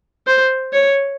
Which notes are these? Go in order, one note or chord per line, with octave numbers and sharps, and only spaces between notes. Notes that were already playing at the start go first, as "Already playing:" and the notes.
C5
C#5